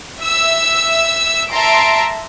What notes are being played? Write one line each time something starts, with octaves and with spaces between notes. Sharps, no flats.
E5 E6
E5 A5 A#5 C6 D7